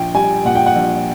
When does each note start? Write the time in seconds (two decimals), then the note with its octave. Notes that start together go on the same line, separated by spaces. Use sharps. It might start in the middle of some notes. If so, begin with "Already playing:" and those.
Already playing: A#1 G5
0.14 G3 G#5
0.45 A#2 F#5
0.55 G5
0.66 F#5
0.76 A#1